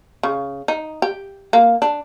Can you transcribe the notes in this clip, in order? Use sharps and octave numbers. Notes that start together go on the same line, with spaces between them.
C#3
D#4
G4
A#3
D4